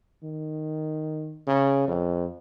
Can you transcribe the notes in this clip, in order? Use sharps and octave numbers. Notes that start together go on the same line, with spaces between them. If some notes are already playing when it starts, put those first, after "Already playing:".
D#3
C#3
F2